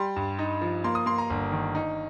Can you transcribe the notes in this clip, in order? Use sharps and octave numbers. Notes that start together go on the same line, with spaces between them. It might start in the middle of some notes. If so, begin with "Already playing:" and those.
Already playing: G3 C6
G2
D#4
F3
A#3 C6
D#6
A#3 C6
A#5
G1
D#3
D#4